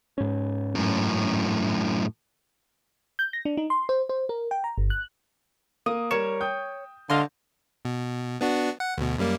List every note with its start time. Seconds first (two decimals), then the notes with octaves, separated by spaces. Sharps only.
0.18 G#2 C#4
0.75 F#2 A2
3.19 G6
3.33 A#6
3.45 D4
3.57 D#4
3.70 C6
3.89 C5
4.09 C5
4.29 A#4
4.51 G5
4.64 A#5
4.78 G1
4.90 F#6
5.86 A#3 D#6
6.11 G3 A#4 C#5 E7
6.41 G5 D#6 G6
7.10 D3 D#5 F5 C6
7.85 B2
8.41 B3 D4 F#4
8.80 F#5
8.98 D2 B2
9.18 F#2 G3 A#3